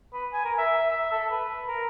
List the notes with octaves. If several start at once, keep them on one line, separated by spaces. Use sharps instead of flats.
B4
G#5
A#4
E5
E5
A4
B4
A#4